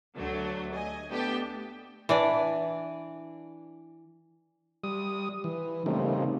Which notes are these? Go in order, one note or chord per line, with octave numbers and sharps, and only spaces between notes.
D2 D3 F#3 A3
D#5 G#5
A3 B3 D4 G4 A4 G5
E3 D4 D5
G3 D#6
E3
C#3 G3 A3 A#3 C4 D#4